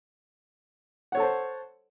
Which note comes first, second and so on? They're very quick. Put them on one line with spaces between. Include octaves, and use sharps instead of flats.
F#5 C#5 A4 A5 C5